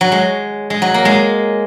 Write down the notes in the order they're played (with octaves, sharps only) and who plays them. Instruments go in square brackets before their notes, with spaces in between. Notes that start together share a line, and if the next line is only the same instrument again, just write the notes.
[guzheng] F#3
G#3
G#3
F#3
A#3
G#3